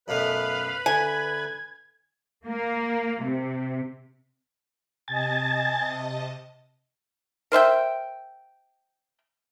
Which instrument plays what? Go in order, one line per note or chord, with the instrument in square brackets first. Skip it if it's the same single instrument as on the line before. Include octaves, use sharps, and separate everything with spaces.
[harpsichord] F#2 B2 A3 [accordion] B4 B5 [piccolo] F5
[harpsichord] D2 [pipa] G#5 [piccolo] G#6
[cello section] A#3
C3
[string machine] C3 D#5 A5 [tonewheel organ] G#5 A6
[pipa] A#4 C5 E5 G5